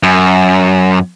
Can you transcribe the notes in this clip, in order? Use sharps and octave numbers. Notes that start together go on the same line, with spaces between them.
F#2